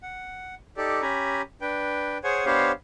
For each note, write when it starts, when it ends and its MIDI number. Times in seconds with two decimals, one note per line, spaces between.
0.03 0.55 78
0.77 1.02 63
0.77 1.02 67
0.77 1.02 69
0.77 1.02 74
1.02 1.42 61
1.02 1.42 67
1.02 1.42 80
1.02 1.42 82
1.02 1.42 83
1.61 2.18 62
1.61 2.18 71
1.61 2.18 79
2.24 2.46 68
2.24 2.46 72
2.24 2.46 73
2.24 2.46 78
2.24 2.46 80
2.46 2.72 59
2.46 2.72 62
2.46 2.72 67
2.46 2.72 72
2.46 2.72 73
2.46 2.72 77